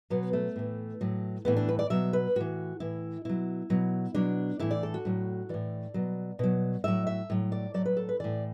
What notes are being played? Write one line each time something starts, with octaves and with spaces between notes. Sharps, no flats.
B2 F#3 B3
A3
A2 E3
A2 F#3
A2 E3 B3
D4
B4
D5
B2 F#3 E5
B4
A2 E3 F#4
A2 E3 E4
B2 F#3 E4
B2 F#3
B2 F#3 D4
A2 E3 E4
D5
A4
F#4
A2 F#3
A2 E3 D5
B2 F#3
B2 F#3
A2 F#3 E5
E5
A2 F#3
D5
A2 F#3 D5
B4
A4
B4
A2 E3 D5